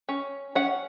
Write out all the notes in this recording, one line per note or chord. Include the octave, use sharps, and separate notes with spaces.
C#4
C#4 F#5